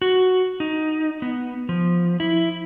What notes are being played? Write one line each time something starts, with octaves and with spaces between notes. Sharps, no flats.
F#4
D#4
B3
F3
E4